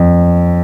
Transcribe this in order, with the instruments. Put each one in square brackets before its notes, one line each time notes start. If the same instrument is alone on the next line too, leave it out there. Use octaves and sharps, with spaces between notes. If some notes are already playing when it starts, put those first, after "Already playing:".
Already playing: [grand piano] F2